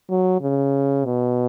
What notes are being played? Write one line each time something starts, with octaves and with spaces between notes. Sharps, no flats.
F#3
C#3
B2